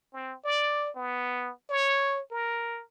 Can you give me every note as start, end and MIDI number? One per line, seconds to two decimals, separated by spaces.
0.13 0.36 60
0.45 0.90 74
0.96 1.52 59
1.70 2.20 73
2.31 2.82 70